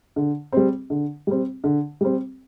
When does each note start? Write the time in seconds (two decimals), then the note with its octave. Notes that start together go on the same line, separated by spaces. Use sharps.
0.16 D3
0.52 G3 C4
0.90 D3
1.27 G3 C4
1.64 D3
2.01 G3 C4